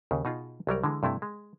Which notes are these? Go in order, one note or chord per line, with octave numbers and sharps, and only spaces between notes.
D#2 C#3
B2 D#4 F4 G#4
C2 F#3 G3 A#4
D3 E3 G#3
G2 C3 A3 E4
G#3